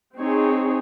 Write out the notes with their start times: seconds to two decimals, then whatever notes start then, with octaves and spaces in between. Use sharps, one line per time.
0.17 C4 D#4 G#4 C#5